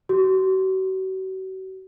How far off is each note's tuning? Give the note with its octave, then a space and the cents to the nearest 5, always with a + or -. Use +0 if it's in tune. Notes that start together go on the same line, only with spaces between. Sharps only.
F#4 +40